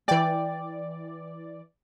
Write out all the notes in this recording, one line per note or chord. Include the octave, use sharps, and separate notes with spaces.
E3 D5 G5